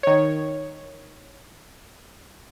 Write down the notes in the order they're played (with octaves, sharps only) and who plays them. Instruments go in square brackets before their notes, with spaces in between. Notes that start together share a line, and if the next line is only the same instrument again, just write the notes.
[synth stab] D#3 C#5